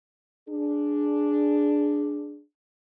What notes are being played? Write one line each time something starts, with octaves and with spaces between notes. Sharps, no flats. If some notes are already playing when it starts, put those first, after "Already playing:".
D4 G#4